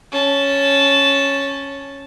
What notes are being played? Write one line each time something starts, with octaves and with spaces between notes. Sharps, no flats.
C#4 A5